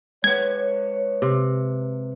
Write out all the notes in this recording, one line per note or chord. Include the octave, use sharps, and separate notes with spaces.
G#3 B4 C#5 F#5 G#6
C3